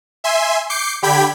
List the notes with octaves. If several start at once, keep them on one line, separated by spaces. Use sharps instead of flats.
E5 G#5 C6
D6 G6 C7 C#7
D3 G4 G5 B5 G#6 B6